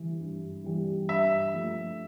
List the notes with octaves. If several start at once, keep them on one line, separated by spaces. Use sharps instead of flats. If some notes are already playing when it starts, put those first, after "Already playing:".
Already playing: E3 G3
G2
E3 G3
G2 E5
F3 A3